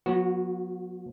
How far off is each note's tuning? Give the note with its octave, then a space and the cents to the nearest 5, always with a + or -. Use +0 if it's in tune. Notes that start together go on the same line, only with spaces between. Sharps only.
F#3 -45 B3 -35 F#4 +0